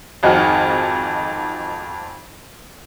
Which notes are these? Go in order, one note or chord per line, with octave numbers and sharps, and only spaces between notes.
G#1 F2 D#4 F#4 G#4 F6